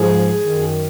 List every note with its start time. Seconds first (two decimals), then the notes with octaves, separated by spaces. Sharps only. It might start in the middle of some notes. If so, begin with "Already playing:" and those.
Already playing: G#2 F3 G#4
0.41 D#3
0.47 F#2